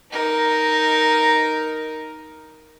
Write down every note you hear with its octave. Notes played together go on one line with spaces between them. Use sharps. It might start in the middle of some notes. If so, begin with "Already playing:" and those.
D#4 A#4